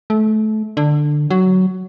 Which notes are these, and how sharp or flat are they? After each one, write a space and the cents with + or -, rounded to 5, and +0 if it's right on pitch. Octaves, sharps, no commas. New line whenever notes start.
A3 -25
D3 +15
F#3 +10